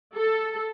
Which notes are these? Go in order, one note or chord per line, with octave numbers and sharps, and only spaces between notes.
A4